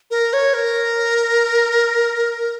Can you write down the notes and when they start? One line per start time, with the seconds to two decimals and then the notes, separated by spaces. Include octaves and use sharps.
0.11 A#4
0.33 C#5
0.54 A#4